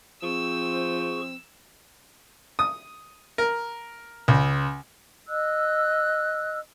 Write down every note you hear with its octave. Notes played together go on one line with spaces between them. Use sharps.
F3 C4 G#4 C#6 E6
D#6
A#4
C#2
D#5 E6 F#6